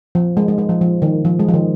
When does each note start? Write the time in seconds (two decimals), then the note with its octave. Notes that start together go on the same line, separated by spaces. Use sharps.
0.15 F3
0.37 G#3
0.48 G#3
0.58 G#3
0.69 F3
0.81 F3
1.02 D#3
1.25 F3
1.40 G#3
1.49 F3
1.54 D#3